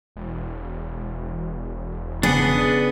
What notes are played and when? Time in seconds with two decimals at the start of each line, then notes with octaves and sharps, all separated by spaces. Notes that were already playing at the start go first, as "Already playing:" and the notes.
0.16 E1
2.23 C#3 B3 D4 G#4 F#5